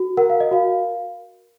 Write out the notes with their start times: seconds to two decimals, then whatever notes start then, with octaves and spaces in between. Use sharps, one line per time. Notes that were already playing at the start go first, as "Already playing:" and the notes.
Already playing: F#4
0.17 A#4 F#5
0.30 F5
0.40 D#5
0.51 F#4 F5